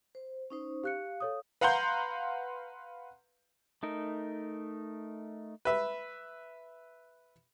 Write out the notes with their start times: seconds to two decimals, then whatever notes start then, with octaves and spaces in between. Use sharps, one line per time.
0.15 C5
0.50 C#4 D#4 C5
0.84 G4 F5 F#6 C#7
1.20 A4 C#5 D#6
1.61 B4 F5 F#5 A#5 C6 G6
3.83 A3 D#4 A#4
5.65 B4 E5